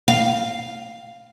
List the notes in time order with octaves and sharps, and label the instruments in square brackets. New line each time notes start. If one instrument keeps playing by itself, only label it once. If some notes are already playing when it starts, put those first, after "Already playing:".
[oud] F5